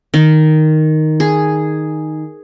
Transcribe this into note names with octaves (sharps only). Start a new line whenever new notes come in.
D#3
G#4